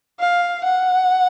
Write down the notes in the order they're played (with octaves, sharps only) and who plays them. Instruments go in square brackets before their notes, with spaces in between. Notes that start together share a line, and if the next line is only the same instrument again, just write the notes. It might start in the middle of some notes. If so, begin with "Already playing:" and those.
[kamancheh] F5
F#5